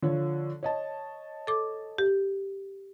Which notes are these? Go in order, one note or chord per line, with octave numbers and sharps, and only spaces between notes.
D3 F3 C#5
C#5 D#5 A5
A4 D6
G4